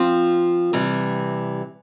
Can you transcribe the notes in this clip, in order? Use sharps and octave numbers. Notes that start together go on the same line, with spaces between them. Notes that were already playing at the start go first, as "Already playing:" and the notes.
Already playing: F3 C4 F4
C3 E3 G3